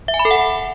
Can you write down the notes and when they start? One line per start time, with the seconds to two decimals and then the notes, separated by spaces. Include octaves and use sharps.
0.08 E5
0.14 G#5
0.19 B5
0.25 A4
0.31 F#5